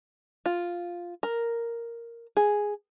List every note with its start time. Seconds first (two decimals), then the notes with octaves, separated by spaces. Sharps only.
0.46 F4
1.23 A#4
2.37 G#4